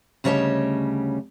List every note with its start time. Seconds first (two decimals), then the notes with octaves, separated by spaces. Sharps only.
0.24 D2 C#3 G3 C#5 D#5 A5